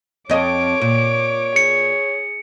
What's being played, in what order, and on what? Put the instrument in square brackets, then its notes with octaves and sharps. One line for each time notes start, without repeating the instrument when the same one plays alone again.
[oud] F2 D#5 [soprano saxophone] C#5 [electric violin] D6 D7
[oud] A#2
[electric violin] G#4 [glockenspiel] C#7